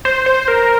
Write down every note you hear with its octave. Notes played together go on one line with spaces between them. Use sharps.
C5
C5
A#4